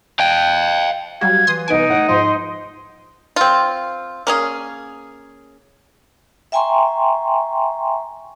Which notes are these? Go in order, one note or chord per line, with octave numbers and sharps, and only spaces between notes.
F5 G5
F#3 G3 F#4 F5 G#6
E3 C6 D#6
C2 B3 D#4 G#5 D7
A2 F#5
G#2 F3 D#5 C6
C4 F4
A#3 C#4 G#4
E5 G5 G#5 A#5 C6 C#6